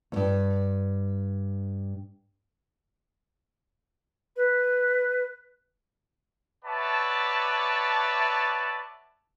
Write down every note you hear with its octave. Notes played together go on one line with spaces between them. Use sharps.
E2 G2
B4
B4 C#5 D5 E5 F#5 A5